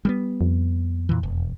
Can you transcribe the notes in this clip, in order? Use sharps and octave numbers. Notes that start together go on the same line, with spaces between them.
G3 A3 B3
F2
A#2 E3
E1